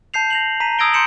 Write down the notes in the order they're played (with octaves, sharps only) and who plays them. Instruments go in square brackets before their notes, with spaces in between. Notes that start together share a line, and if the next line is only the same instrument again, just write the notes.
[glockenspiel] A5 G6 C7 F7
A#6 F7 F#7
A#5 B6 D#7
D#6 E6 G#6 A#6 D7 G7
A#5 C6 G6 C#7 E7 F#7